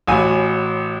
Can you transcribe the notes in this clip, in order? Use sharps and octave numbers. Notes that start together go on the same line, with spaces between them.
A1 A2 F#3 G#5